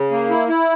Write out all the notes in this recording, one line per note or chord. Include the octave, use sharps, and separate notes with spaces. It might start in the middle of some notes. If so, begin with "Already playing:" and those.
Already playing: C#3
A#3
E4
E4